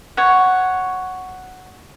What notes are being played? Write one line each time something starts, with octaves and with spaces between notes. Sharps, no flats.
C#5 F#5